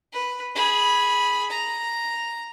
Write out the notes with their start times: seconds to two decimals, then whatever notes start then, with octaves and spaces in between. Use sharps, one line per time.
0.13 B4
0.55 G#4 B5
1.50 A#5